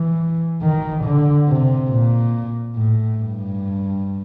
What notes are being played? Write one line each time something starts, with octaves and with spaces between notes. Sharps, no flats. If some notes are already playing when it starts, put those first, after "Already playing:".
Already playing: E3
D#3
D3
C3
A#2
A2
G2